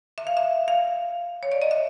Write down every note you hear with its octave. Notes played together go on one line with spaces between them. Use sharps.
E5
F5
E5
F5
C#5
D5
D#5
E5